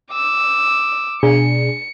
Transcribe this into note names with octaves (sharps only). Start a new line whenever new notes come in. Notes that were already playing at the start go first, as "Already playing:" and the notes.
D6 E6
B2 D4 G#4 C#7